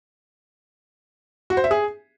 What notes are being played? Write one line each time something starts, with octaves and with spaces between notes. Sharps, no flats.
F#4
C5
E5
G#4